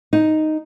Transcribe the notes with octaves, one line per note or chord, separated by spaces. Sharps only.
D#4